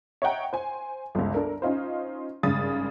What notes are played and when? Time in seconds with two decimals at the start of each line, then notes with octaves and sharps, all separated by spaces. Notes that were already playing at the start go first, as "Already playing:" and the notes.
0.22 C#5 D#5 E5 F#5 G5 A#5
0.53 C5 G#5
1.15 G1 C#2
1.34 D4 A4 A#4
1.62 C#4 D#4 F4 C5
2.43 G#1 G2 C#3 D#6 A6